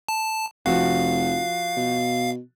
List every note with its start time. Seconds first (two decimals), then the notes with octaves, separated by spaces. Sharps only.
0.09 A5
0.66 F1 F3 F#4 F5
1.77 B2